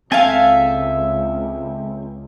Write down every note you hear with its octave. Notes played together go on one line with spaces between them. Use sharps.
C#2 C4 A4 E5 F5 G#5